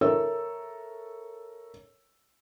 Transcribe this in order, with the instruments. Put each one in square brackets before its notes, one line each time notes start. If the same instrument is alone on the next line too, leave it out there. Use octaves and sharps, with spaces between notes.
[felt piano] A4 A#4 C#5 E5 E6